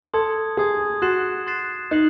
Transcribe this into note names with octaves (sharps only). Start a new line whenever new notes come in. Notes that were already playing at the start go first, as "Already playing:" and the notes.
A4 C6 D#6 G#6
G#4 C6 D#6 G#6
F#4 C6 F#6 A6 C7 E7
C6 F#6 A6 C7 E7
D#4 F#6 C7 F#7